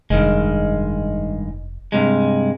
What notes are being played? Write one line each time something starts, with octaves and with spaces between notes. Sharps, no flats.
F1 G2 D#3 G#3
G2 C3 G#3